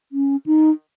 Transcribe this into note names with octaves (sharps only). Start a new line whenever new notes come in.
C#4
D#4